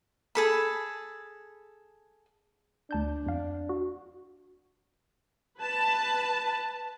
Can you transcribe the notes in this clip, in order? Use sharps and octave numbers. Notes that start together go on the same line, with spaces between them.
G#4 A4 B5
D2 D4 A5 G6
F2 F5
F#4
B4 A5